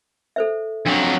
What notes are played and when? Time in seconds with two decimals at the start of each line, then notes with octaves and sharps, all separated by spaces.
0.36 A4 C5 E5
0.86 F2 F#3 D4